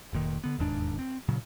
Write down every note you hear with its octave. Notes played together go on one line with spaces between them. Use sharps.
F1 A#2 D#3
D3 B3
E1 D#2 G#2 D4
C4
A#2 C#3 F#3